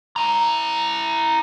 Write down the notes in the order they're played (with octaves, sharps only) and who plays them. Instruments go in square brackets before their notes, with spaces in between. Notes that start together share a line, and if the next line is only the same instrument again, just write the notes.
[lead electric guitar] E4 A#5